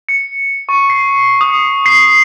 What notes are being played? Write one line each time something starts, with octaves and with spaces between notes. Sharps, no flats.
C#7
C#6
C7
D#6
C7